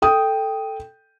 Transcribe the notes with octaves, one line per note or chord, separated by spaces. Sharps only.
A4 G5 D#6